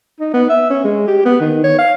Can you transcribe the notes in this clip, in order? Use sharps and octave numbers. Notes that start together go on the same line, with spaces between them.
D#4
B3
E5
C#4
G#3
G4
B3
D#3
C#5
F5